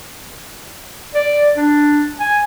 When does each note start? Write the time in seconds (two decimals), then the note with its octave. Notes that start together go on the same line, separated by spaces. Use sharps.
1.15 D5
1.57 D4
2.20 G#5